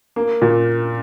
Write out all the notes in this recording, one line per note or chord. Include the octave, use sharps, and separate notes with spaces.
A#3
A#2